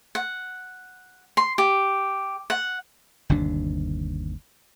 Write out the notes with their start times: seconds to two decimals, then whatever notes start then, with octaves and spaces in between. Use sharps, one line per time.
0.15 F#5
1.37 C6
1.58 G4
2.50 F#5
3.29 G1 D#2 C3 D4